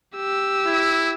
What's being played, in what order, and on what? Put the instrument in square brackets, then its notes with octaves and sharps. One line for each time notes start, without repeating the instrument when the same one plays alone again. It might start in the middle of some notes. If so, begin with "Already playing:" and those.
[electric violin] G4 E6
[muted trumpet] E4